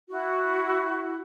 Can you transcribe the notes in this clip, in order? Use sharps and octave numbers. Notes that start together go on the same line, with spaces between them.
E4 F#4